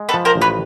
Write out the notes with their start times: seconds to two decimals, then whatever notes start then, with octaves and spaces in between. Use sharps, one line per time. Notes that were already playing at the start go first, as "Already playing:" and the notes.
Already playing: G#3
0.09 A4 B4
0.14 F3
0.25 A#4 C5
0.35 A1
0.41 B4 C#5